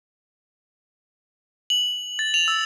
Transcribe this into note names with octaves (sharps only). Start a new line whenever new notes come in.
F#7
A6
F7
E6